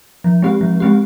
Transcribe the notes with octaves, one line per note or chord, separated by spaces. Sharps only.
F3
G#3 C4 G4
F3
G#3 C4 G4